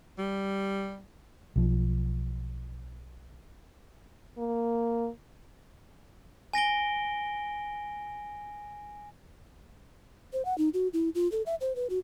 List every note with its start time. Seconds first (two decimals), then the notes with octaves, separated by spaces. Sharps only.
0.18 G3
1.56 B1 F3
4.38 A#3
6.53 G#5 A#6 D7 G7
10.33 C5
10.45 F#5
10.58 D#4
10.74 F#4
10.93 E4
11.15 F4
11.32 A4
11.46 E5
11.61 C5
11.76 B4
11.90 F#4